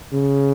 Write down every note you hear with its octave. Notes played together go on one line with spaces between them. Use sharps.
C#3